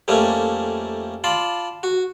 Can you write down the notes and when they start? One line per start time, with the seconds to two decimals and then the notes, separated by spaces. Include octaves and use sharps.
0.08 F2 G3 A3 A#3 C#4 E4
1.24 F4 D5 A5 B5 C6
1.83 F#4